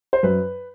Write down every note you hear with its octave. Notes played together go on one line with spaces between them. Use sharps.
C5
F#2 B4